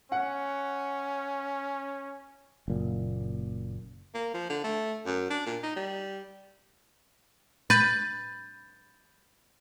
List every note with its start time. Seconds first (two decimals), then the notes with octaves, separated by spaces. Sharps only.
0.12 C#4 F#5
2.68 F#1 A#2
4.14 A#3
4.34 F3
4.50 D3
4.64 A3
5.06 F#2
5.30 D4
5.46 A#2
5.63 D#4
5.76 G3
7.70 B4 G6 A6